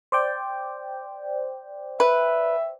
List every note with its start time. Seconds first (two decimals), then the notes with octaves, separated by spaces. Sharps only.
0.12 C5 D5 G5
2.00 B4 E5